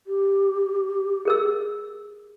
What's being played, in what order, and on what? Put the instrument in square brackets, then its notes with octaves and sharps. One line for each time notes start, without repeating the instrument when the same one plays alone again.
[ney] G4
[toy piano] G#4 A#4 E6